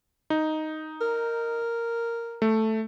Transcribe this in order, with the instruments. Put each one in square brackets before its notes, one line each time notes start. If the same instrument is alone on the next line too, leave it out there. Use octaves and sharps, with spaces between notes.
[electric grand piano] D#4
[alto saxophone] A#4
[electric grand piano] A3